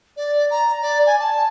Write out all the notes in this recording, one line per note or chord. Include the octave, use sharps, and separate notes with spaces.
D5
A#5
D5
G#5
A5